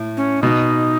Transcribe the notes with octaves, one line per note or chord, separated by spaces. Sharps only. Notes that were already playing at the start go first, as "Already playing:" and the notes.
Already playing: A2
C#4
B2 D#4